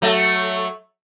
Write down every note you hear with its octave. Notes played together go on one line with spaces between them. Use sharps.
F#3 A3